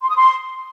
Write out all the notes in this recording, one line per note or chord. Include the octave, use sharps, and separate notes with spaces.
C6
D#6
C6